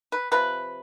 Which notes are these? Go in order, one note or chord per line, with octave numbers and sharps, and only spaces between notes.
B4
C3 F3 B4